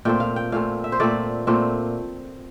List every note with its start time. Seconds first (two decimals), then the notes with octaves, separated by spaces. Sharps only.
0.05 A#2 A3 C4 G5
0.20 F5
0.36 G5
0.52 A#2 A3 C4 F5
0.84 E5
0.92 C5
1.00 A#2 A3 C4 D5
1.47 A#2 A3 C4